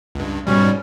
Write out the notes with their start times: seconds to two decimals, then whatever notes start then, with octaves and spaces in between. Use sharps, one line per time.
0.15 C#2 G2
0.47 G#2 B2 G3 C#4